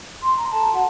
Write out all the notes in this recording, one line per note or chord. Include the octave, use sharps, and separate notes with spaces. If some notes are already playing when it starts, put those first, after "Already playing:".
C6
A#5
A4 A5
F#4
F#5